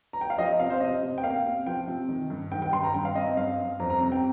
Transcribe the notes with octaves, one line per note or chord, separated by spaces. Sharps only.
A#5
G5
F5
F3 D#5
C3 F5
C5
C3 D#5
C3
G5
A#3 F5
C3
F3 G5
C3
D#3
G2
D#3 G5
G5
G2 C6
A#5
G2 G5
F5
C4 D#5
D#5
G2 F5
G2
F2 A#5
A#5
C3 A#5
G5